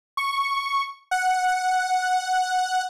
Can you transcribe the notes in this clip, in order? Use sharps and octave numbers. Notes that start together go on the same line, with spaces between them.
C#6
F#5